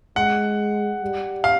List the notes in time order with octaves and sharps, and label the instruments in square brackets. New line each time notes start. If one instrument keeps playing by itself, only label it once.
[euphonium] G#3 [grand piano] F#5
[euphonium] G3
[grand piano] F5